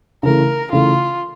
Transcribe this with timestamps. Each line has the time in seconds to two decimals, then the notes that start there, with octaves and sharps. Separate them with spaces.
0.23 C#3 E3 A3 A#4
0.72 C#3 E3 A3 F4